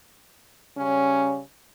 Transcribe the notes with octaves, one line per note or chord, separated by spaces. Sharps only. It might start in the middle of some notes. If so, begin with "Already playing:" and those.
C#3 G3 C#4